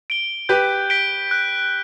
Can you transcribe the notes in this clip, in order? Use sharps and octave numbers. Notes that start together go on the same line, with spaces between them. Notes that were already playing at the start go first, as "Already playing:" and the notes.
D7 G7
G4 B4 G6
B6 D7 G7
F#6